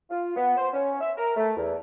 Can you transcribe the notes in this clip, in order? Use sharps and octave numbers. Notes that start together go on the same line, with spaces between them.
F4
B3
C5
C#4
E5
A#4
A3
E2